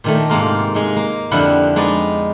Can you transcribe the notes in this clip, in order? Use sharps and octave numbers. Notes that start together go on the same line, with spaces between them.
A#2 D#3 A3
G#2 C3 A#3 F4
G#3 D#4
A#3
F2 D3 F3 G3 E4 F#5
G#3 B3 D#4 D5